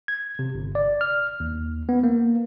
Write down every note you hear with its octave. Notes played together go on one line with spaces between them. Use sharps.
G#6
C3
G1
D5
F6
D#2
B3
A#3